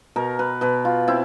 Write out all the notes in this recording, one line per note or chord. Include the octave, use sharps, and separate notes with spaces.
B2 A#4
B4
B2 B4
F4
C4 E4